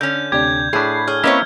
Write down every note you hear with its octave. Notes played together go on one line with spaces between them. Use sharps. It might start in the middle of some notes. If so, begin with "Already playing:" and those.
D3 C#4 G6
D2 C3 D4 G4 G#6
A2 D4 G#4 B5 C7
G#4 C#5 F6
A#3 C4 C#4 E4 B4 C#5 D#5 E5